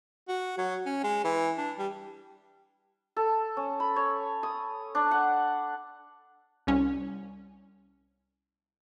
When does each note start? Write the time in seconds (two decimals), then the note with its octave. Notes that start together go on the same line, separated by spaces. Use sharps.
0.28 F#4
0.58 F#3
0.86 C#4
1.03 G#3
1.24 E3
1.58 D4
1.79 G3
3.16 A4
3.57 C#4
3.80 B5
3.96 C#5
4.43 D#6
4.95 D4
5.11 F#5
6.67 C2 C#4